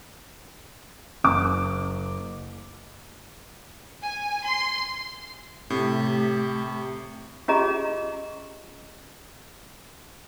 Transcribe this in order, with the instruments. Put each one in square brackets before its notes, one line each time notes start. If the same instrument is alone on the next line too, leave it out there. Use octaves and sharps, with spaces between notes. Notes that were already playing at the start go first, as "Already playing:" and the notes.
[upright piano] F#1 D6
[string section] G#5
C6
[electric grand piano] A2 [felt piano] C3 [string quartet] A3 [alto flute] G4
[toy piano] C#4 F4 G4 G#4 D#5 A#5